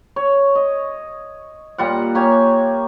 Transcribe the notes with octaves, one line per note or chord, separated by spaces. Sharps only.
C#5
D#5
A#2 G3 F4 F#5
A#3 G4 C#5 G#5